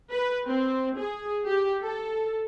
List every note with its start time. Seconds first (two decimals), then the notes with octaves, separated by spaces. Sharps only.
0.11 B4
0.46 C4
0.99 G#4
1.46 G4
1.83 A4